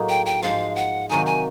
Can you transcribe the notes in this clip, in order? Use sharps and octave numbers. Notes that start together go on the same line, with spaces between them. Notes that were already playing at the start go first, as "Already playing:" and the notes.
Already playing: A2 F#3 A#3 D#4 G#4
G5
G5
G#2 F3 G#3 F5
F#5
C3 D#3 F#3 A#3 D#4 G#5
G#5